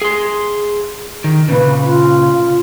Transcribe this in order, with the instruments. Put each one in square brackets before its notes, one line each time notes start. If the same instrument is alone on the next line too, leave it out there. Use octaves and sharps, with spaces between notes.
[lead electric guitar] G#4 C6
D#3
[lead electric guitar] A#2 C#3 [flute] B4
[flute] F4